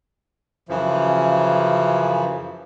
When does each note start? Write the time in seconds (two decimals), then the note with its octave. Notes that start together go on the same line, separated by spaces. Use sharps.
0.69 F#2 C#3 E3 F3